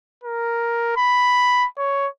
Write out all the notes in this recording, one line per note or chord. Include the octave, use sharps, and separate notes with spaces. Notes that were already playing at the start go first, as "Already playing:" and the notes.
A#4
B5
C#5